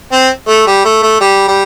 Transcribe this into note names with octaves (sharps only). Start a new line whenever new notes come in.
C4
A3
G3
A3
A3
G3
G3